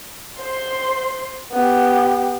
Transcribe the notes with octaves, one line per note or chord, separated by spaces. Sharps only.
C5 C6
B3 G4